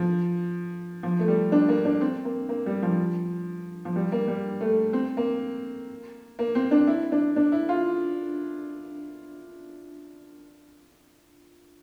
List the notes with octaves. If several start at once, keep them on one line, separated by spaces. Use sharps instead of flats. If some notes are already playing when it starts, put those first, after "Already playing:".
Already playing: F3
F3
A3
G3
D4
A#3
D4
C4
A#3
A#3
G3
F3
F3
G3
A#3
G3
A3
C4
A#3
A#3
C4
D4
E4
D4
D4
E4
F4